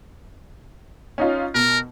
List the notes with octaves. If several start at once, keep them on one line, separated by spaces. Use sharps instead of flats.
C#4 D#4 F4
B2 A#4